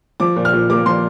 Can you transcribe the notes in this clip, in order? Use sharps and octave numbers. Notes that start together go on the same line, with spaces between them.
F3 D6
A#2
F6
A#2
A#3 D6
F3 C6